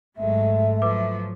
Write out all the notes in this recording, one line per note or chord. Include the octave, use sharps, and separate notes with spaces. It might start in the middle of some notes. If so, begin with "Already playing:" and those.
G#1 F#3 G#3 A3 E5
F3 F#3 B4 D6